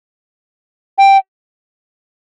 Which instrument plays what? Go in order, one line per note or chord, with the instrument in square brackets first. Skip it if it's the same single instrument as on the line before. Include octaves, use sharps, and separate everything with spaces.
[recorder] G5